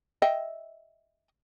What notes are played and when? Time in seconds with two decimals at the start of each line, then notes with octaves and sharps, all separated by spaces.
0.22 D#5 E5 G5